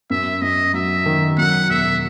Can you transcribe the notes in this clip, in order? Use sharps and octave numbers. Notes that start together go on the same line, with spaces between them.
F#2 E5
F#2 D#5
F#3 E5
D#3
F#3 F#5
E1 E5